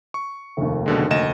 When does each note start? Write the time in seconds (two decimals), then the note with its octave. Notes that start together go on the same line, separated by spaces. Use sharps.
0.14 C#6
0.57 F1 D#2
0.86 B2 D3 G#3
1.11 D2 D#5 E7